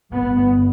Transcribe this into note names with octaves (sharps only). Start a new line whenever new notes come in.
G1 G2 B3